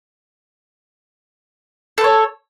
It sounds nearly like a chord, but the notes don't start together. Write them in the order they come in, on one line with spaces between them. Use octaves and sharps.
A4 B4 C#5